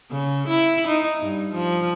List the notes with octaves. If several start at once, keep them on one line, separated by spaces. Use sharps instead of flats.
C#3
E4
D#4
G2
F3